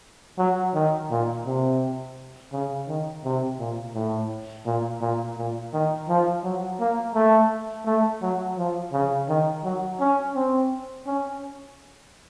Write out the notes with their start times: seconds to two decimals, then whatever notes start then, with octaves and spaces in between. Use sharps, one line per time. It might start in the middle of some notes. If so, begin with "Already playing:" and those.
0.39 F#3
0.75 D#3
1.11 A#2
1.46 C3
2.53 C#3
2.88 D#3
3.24 C3
3.59 A#2
3.95 A2
4.66 A#2
5.01 A#2
5.38 A#2
5.73 D#3
6.09 F3
6.44 F#3
6.80 A#3
7.15 A3
7.86 A3
8.22 F#3
8.58 F3
8.93 C#3
9.29 D#3
9.64 F#3
10.00 C#4
10.35 C4
11.07 C#4